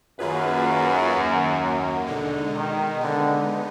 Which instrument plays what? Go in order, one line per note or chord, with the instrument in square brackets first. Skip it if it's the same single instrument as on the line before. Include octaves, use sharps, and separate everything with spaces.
[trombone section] F#2 [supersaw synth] D#3 A#3 F4 G#4 B4
[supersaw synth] D#2 D#3 A#3
[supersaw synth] B2 G#3 D#4 [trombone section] D3
[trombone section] D#3
[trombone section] D3 [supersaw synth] G#3 B3 D#4